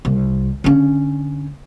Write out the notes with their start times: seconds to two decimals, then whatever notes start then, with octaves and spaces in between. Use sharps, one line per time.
0.05 C2
0.64 D3 C#4